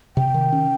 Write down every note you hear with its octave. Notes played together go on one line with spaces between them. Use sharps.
C3 G5
D#3
C#4